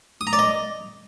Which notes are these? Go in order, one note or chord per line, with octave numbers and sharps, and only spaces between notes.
D#6
A#5
D5
D#5